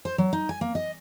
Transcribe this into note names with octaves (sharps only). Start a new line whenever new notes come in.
C5
F#3
D#4
G#5
A#3
D#5